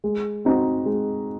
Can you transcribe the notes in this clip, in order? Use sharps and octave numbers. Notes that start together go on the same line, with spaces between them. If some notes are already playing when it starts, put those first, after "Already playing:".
G#3
C4 D#4 F#4
G#3